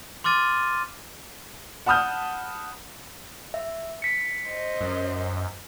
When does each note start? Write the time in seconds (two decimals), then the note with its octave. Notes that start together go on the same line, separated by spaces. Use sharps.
0.24 C6 D6 F6 A6 D#7
1.86 F#5 A5 B5 D#6 F6 G6
3.54 E5
4.02 B6 C#7
4.48 C5 D#5
4.81 F#2